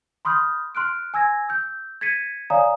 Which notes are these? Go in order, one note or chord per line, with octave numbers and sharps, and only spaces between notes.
B5 C6 D#6 F6 G6
C6 F6 F#6 D7
G#5 E6 G#6 A#6
E6 G6
G#6 A6 B6 C#7 D#7
C#5 D5 F5 G#5 A#5 D#6